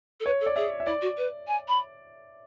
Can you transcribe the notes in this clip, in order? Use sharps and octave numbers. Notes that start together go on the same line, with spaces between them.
A4
B4 C#5
A4
D5
G#4 E5
E5
E4 D5
F#4
B4
G#5
B5